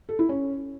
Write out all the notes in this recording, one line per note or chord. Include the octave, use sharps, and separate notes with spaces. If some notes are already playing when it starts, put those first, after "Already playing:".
A4
E4
C#4